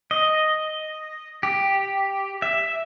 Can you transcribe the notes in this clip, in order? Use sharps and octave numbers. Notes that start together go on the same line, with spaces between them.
D#5
G4
E5